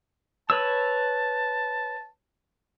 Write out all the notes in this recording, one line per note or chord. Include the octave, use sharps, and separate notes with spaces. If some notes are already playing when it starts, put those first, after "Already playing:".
B4 C#5 A5 E6